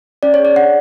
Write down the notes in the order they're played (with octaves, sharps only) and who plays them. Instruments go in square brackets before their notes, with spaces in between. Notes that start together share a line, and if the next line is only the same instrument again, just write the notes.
[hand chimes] C#4 D5
C#5
G#4
D5
D4 F#5